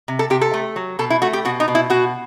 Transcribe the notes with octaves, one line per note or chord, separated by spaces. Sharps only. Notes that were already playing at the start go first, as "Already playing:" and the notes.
C3
A4
C3 G4
A4
A3
F#3
B2 A4
E4
A3 F#4
G4
B2 F#4
D#4
B2
E4
B2 F#4